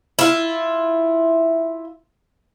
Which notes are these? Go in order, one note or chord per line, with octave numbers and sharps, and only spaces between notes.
E4 F4